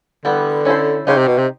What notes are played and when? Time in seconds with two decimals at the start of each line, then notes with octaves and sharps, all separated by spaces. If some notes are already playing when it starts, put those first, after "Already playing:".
0.25 D3 E3 G3 B3
0.65 C#4 E4 A4 C5
1.07 C#3 D#4 G4 C5
1.17 C3
1.28 B2
1.38 C3